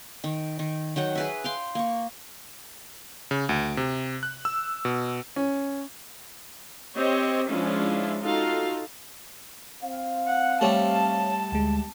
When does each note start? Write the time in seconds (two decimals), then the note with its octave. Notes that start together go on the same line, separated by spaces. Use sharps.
0.24 D#3
0.59 D#3
0.96 D#3 F#3 F#5 G5
1.15 G#4 B4 E5
1.44 F5 G5 C6
1.75 A#3 C#6
3.31 C#3
3.49 D2
3.77 C3
4.23 F#6
4.45 E6
4.85 B2
5.36 C#4
6.97 C4 G4 C#5 D#5
7.49 F3 G#3 C#4 D4 E4 F4
8.20 D#4 F4 F#4 A4 F5
9.83 C4 F5
10.27 F#5
10.61 G3 A3 G4 C#5 A5
11.52 D2 G#3